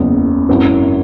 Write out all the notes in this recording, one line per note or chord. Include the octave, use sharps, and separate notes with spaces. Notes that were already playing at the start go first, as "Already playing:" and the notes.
Already playing: F#1 E2 C#3
G#1 F#2 F#3 E4